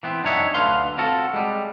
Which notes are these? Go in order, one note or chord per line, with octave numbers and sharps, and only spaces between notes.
E3 B3 C4
F#2 D4 D#4 C#5 E5
D2 D3 B4 F5 C6
C4 F4 F#4 A4
G3 G#3